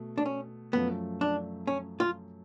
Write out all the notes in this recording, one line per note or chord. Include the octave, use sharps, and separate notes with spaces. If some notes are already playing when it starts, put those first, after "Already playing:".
Already playing: B2 A3
D4
C#4
F#2 F3 A3 B3
D4
C#4
F4